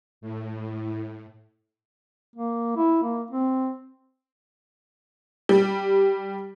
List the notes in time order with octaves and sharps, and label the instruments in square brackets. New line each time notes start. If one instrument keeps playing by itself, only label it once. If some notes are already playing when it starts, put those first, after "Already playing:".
[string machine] A2
[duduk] A#3
E4
A#3
C4
[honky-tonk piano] G3